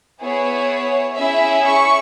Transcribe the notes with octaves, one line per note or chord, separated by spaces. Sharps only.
B3 E4 G#4 C#5
C#4 E4 G#4 E5
C#6